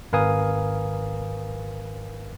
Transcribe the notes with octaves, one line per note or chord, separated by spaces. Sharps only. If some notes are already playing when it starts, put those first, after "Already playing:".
G#1 A#4 B4 F5 G#5 D#6